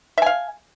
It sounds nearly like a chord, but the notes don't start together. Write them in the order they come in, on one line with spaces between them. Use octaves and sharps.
E5 G#5 F5